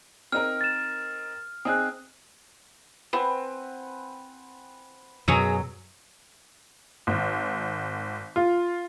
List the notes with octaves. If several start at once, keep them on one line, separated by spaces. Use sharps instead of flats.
C4 D#4 A#4 F6
A6 E7
C4 D#4 G#4 D#6 F#6
C4 B4 F#5 G#5
F#2 B2 F#3 G#4 A#5 E6
G#1
F4